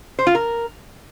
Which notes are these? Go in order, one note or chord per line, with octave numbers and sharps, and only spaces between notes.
C5
F4
A#4